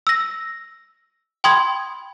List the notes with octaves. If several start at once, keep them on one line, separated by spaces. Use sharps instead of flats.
E6 A#6
G5 B5 C6 D#6 G#6